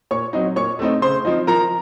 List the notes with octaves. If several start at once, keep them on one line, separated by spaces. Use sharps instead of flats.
A#2 C#5 C#6
F#3 C4 D#4
A#2 C#5 C#6
A3 C4 D#4
C#3 C5 C6
F3 C4 D#4
F3 A#4 A#5